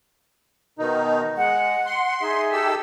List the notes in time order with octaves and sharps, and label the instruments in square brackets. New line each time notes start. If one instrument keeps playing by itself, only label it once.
[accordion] B2 D#3 D#4
[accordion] G#3 [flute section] F#5
[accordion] C6
[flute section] D#4 G#4 E5
[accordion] G4 A4 E6